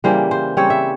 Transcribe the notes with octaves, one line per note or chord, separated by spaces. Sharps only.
C#3 E3 G3 A#3 C5
C5
C#3 G3 C4 C#5
E5